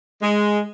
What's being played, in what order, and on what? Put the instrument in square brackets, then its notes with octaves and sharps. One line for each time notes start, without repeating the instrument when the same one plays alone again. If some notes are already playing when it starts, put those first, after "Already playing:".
[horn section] G#3